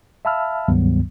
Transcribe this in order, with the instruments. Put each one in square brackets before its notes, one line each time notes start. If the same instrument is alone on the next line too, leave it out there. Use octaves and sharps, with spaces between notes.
[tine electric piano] E5 F5 A5 B5 E6 F6
C#2 G2 D#3 F#3 G3 B3